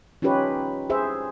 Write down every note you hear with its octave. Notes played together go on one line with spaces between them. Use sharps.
C#4 D#4 F4 G4 B4 C#5
G#4 C5 E5